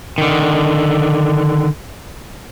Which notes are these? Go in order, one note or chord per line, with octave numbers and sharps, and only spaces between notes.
D3 D#3